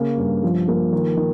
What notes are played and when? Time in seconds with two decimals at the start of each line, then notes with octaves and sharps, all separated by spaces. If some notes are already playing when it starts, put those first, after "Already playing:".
Already playing: C#3 A#3
0.17 G2
0.43 F3
0.68 A#3
0.92 D#3
1.17 D#3